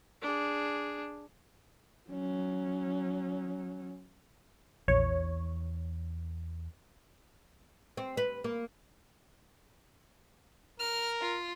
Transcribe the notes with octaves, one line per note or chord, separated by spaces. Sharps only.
D4 G#4
F#3 C#4
A#1 E2 C#5
C4
B4
A#3
A#4 F6
F4